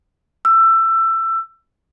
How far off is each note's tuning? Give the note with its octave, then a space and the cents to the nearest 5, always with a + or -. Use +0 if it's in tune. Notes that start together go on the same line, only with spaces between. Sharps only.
E6 +20